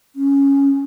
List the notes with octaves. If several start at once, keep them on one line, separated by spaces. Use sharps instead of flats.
C#4